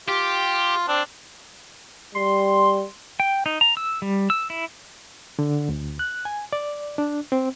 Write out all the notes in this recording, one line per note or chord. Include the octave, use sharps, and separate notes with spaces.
F4 G4
C4 D4
G3 C6
G5
D#4
A#5
E6
G3
E6
E4
D3
D2
F#6
G#5
D5
D4
C4